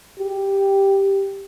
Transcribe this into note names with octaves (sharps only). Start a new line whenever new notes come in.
G4